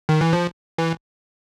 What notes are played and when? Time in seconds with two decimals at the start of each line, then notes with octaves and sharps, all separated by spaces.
0.09 D#3
0.21 E3
0.33 F3
0.78 E3